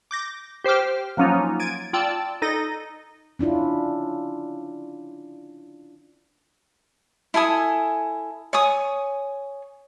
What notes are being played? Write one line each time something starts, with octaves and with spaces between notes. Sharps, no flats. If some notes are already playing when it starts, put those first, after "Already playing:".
D6 G6 A#6
G4 C5 G5 D6 F6
F3 F#3 A#3 C#4 D#4 F4
G#6 A6 D7 D#7
F4 D5 G5 A5 E6
D#4 A4 D#5 A#6
C#4 D4 E4 F4
E4 A4 G#5 D#6
C#5 G#5 D#6